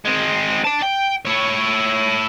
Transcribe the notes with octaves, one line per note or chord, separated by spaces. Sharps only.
G#3 C4
D5 A5
G5
E4 C#5